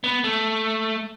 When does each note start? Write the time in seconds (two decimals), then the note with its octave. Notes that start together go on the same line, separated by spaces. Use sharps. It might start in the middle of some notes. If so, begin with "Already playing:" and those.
0.04 B3
0.24 A3